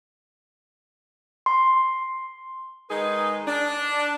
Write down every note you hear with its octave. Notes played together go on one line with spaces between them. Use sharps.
C6
D#3 G#3 D#4 G#4 B4
D4